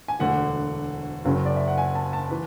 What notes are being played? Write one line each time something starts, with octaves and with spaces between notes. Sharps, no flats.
G#5
E1 D2 D3 A3 F#5
F#1 F#2 C#3 F#3
D5
E5
F#5
G#5
A5
A5
E3 B4